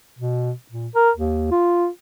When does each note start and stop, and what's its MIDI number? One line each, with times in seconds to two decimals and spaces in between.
0.19 0.52 47
0.71 0.88 46
0.95 1.11 70
1.16 1.47 39
1.51 1.88 65